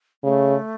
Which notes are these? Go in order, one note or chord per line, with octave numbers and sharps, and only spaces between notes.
C#3 A3